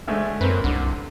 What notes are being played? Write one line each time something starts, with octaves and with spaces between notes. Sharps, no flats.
D2 G#3 A3
F#2 A#3 C4 B4
C2 D3